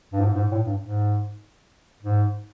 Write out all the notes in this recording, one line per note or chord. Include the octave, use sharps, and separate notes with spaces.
G2
G#2
G2
G#2
A2
G2
G#2
G#2